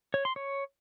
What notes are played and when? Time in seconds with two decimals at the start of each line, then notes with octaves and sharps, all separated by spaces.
0.14 C#5
0.25 C6
0.36 C#5